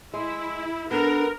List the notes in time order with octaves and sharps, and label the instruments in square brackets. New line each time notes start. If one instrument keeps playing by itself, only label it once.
[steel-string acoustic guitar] G#3 [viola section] E4
[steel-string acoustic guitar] B3 A4 [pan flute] D4 [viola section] A#4